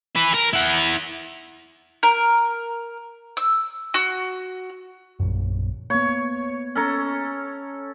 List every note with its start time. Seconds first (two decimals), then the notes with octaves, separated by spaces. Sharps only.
0.15 E4 B4
0.34 A#4
0.53 E4 F#5
2.03 A#4
3.37 E6
3.94 F#4
5.20 A#1 F#2
5.90 A#3 B3 C#5
6.75 C#4 A4 A#5